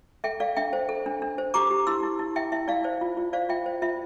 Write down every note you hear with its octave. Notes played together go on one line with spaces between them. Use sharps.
A4 E5 G5
A4 D5 F5
D4 E5 G5
C5
A4
D4
D4
C5
G4 A#5 D6
G4
E4 C6 E6
E4
E4
E4 E5 G5
E4 E5
E4 D5 F5
C5 D5
F4
F4
C5 D5 F5
F4 E5 G5
C5
F4 E5